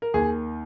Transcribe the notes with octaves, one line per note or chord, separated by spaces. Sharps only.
A#4
D#2 D#3 G#4